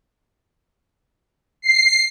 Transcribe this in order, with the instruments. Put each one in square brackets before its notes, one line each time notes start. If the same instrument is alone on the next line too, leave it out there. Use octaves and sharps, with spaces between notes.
[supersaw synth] C7